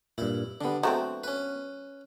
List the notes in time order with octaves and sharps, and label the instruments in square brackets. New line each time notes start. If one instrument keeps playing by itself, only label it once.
[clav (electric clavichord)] G2 A#2 [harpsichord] E4
[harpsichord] D3 G3 [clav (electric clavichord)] B3 D4
[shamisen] F#3 A3 C4 [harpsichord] F#4
[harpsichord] C#4 B4